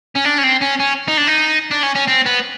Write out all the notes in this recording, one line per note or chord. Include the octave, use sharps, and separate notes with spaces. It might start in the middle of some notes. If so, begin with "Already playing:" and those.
C#4
D4
C#4
C4
C#4
C#4
D#4
D4
D#4
D4
C#4
C#4
C4
B3